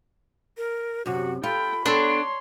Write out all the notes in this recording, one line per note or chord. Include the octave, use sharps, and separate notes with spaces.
A#4
F#2 C3 F#4
F4 A4 G5 B5
B3 D4 A4 C#5 C6